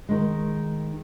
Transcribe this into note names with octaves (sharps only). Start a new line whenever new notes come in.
D#3 G#3